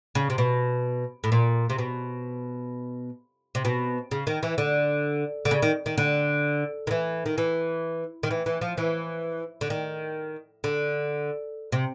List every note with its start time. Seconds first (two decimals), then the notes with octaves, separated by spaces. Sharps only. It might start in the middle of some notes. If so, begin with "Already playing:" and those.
0.15 C#3
0.30 C3
0.38 B2
1.24 A2
1.32 A#2
1.70 C3
1.78 B2
3.55 C3
3.65 B2
4.11 C#3
4.27 D#3
4.43 E3
4.58 D3
5.45 D3
5.51 C#3
5.62 D#3
5.86 D#3
5.98 D3
6.87 D#3
6.91 E3
7.26 D#3
7.38 E3
8.23 D#3
8.31 E3
8.46 E3
8.61 F3
8.78 E3
9.61 D3
9.70 D#3
10.64 D3
11.72 C3